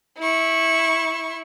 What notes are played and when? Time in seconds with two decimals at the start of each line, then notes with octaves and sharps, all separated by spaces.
0.18 E4 C#6